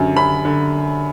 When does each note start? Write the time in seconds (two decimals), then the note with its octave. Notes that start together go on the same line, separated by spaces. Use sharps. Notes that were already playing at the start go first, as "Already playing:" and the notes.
Already playing: F#2 D3
0.16 F#2 B5
0.45 D3